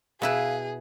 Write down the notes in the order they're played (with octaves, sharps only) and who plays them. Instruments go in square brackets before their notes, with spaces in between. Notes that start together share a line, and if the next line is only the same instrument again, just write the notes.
[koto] B2 E4 B4 [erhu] G#4 [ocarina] F5